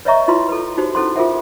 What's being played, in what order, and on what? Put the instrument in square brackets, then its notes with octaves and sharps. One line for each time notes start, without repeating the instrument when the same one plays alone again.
[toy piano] B4 C#5 D#5 E5 A#5 C#6
E4 F4 B4 C6
A4 B4
D#4 F#4 G4 C5
C#4 E4 A4 C5 F#5 C6
F4 G#4 A#4 C5 E5 F#5